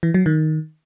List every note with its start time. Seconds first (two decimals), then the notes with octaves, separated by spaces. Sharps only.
0.03 E3
0.14 F#3
0.26 D#3